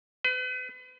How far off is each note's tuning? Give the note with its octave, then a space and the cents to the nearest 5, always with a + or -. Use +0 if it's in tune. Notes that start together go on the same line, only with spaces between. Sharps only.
B4 +40